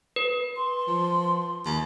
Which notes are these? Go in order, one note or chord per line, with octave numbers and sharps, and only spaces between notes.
B4
C6
F3
D#2